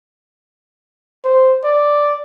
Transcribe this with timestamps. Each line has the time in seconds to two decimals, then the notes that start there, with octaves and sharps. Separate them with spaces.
1.24 C5
1.64 D5